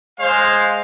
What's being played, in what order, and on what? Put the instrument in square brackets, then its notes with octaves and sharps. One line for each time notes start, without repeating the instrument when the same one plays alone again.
[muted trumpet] G#3 [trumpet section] C5 F5